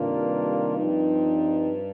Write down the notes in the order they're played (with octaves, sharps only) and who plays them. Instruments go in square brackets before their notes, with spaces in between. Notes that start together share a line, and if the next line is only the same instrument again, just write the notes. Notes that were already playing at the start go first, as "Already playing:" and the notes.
Already playing: [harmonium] G2 [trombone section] C3 D#3 A#3 D4 F4
[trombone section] F3 C4 D#4